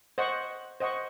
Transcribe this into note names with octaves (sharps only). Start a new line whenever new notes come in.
C5 D#5 F#5 C#6
C5 D#5 F#5 C#6